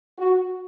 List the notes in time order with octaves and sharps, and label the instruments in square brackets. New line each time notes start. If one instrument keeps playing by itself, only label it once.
[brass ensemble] F#4